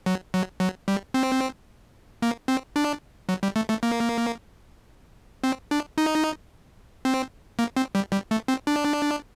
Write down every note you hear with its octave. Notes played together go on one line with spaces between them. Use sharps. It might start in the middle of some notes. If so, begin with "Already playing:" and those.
F#3
F#3
F#3
G3
C4
A#3
C4
D4
F#3
G3
A3
A3
A#3
C4
D4
D#4
C4
A#3
C4
G3
G3
A3
C4
D4